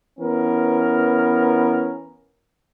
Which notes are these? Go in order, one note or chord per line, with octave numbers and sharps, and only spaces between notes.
E3 B3 C#4 A#4